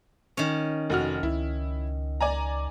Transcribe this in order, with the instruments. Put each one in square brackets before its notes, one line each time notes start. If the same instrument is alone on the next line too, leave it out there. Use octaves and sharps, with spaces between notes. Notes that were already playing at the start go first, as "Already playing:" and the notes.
[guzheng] D#3 C#4
[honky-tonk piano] F1 F#4 F6
[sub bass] C#2 [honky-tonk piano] E4
[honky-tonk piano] D5 G#5 A#5